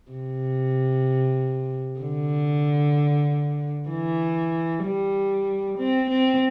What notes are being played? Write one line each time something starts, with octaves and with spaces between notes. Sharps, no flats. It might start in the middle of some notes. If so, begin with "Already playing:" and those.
C3
D3
E3
G3
C4
C4